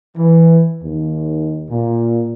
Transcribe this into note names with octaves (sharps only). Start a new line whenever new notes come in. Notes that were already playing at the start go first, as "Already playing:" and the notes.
E3
D#2
A#2